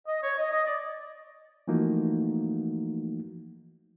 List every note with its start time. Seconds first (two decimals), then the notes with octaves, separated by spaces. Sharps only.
0.07 D#5
0.23 C#5
0.39 D#5
0.52 D#5
0.67 D5
1.68 E3 F3 A3 A#3 D#4 F#4